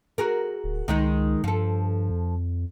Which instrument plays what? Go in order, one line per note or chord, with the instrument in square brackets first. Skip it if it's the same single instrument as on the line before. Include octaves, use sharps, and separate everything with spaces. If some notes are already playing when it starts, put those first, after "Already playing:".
[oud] F#4 G#4 A#4
[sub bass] D1
[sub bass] C#2 [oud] D#3 G#3 D#4
[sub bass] G2 [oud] F3 A4
[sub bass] F2